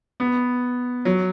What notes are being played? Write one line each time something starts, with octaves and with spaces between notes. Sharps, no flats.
B3
F#3